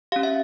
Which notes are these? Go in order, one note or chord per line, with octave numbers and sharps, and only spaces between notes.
C#4 G4 F5
E5